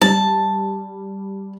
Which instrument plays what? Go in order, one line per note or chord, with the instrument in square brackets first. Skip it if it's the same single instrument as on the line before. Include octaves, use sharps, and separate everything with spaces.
[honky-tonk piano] G3 [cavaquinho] A5